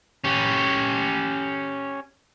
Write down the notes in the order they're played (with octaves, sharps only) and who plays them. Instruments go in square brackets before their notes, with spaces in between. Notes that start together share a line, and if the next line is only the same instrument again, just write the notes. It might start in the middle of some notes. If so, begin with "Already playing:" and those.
[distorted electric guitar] C#4 G4